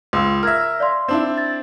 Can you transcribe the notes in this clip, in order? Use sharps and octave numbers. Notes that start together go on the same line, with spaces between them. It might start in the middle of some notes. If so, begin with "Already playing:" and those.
C#2 C6 E6
A#4 E5 F6 G#6
D5 F5 C6
C4 D4 E4
A6